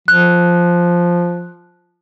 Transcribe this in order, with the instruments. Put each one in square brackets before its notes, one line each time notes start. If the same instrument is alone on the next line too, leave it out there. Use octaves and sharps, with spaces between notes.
[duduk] F3 [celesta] F#6